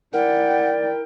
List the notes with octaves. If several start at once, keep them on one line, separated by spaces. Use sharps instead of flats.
E4 A#4 D5 F#5 G5